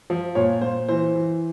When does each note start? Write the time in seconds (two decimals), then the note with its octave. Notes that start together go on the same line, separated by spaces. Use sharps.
0.10 F3
0.35 A#2 C#5
0.62 A#2 C5
0.89 E3 C5
1.16 E3